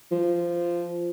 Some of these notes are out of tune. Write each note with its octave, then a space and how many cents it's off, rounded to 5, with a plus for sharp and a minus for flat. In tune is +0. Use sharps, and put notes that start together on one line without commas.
F3 -15